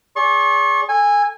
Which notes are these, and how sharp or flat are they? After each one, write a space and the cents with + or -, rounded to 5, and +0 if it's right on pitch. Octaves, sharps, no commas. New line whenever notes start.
G#4 +0 D5 -40 C#6 -40
A4 +0 G#5 -15